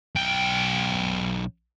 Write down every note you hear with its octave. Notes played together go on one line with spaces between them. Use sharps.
B1 G5